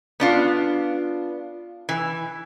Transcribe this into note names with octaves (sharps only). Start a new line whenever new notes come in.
B3 D4 F4
E3